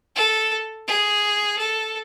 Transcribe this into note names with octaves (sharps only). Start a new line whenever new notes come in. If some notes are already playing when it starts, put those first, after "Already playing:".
A4
G#4
A4